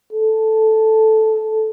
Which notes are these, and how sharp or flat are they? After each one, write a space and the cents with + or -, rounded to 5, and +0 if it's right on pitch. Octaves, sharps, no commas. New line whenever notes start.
A4 -5